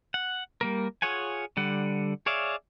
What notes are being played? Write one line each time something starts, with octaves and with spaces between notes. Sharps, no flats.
F#5
G3 A#3 A#4
F4 G#4 C#5 F#5 G#5
D3 G3 F#5
G#4 C#5 D5 E5 F5